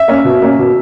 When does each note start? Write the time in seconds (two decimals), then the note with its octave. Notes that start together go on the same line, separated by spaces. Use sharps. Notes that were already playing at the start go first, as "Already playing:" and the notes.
Already playing: E5
0.08 A#3 C#4
0.25 B2
0.42 A#3 C#4
0.59 B2